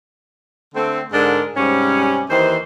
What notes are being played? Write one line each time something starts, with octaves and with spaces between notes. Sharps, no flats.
D3 A3 C4
G#2 D3 G#3 D4 A#4
G#2 C3 G3 C#4
D#2 D#3 E3 C5